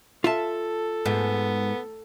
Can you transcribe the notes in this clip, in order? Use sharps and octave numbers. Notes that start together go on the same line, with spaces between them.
F4 A4 E5 A5
G#2 B3